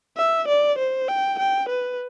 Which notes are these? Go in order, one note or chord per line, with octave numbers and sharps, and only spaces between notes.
E5
D5
C5
G5
G5
B4